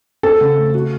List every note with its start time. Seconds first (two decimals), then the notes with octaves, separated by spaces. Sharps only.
0.23 C4 A4
0.41 C#3
0.57 A3
0.74 F#4